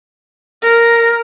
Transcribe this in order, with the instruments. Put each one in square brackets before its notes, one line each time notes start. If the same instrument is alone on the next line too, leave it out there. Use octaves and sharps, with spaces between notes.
[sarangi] A#4 [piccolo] A#6